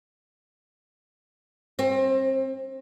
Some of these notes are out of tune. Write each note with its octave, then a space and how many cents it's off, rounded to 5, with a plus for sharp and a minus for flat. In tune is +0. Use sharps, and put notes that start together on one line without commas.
C4 +30